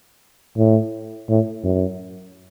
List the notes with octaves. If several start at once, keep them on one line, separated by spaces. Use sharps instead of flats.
A2
A2
F#2